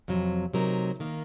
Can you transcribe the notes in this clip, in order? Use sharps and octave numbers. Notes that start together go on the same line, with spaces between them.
F2 C3 F#3
C3 F#3 A3 D#4 A#4
D#3 A#3